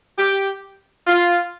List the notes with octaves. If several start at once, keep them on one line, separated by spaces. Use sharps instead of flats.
G4
F4